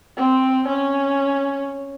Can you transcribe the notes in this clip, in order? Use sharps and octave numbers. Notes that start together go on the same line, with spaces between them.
C4
C#4